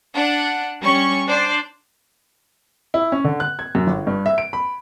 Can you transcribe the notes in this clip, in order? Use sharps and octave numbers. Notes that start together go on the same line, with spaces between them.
D4 F#5
G3 C#4 C#6
D4 C5 D5
E4
C#4
D3
F#6
G#6
F#2
G1
G2
E5
D7
B5